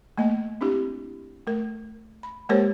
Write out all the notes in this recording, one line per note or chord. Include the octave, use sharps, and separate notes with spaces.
A3 A#3 D#5
C4 D4 E4 G4
A3 A#4
B5
G#3 A#3 G4 A#4 C5 C#5